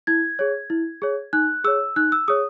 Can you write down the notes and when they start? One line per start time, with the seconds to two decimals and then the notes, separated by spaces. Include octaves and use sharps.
0.07 E4 G#6
0.39 G#4 C#5
0.70 E4
1.02 G#4 C#5
1.33 D#4 F#6
1.64 G#4 C#5 E6
1.96 D#4 F#6
2.12 E6
2.28 G#4 C#5 D#6